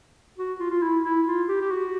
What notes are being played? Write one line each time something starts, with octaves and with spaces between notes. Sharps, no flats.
F#4
F4
F4
E4
E4
F4
G4
G4
F#4